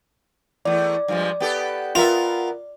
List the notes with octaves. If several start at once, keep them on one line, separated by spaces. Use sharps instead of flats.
E2 A3 D5
G2 F3 G#3
B3 G4 A4
B3 F4 A#4 E5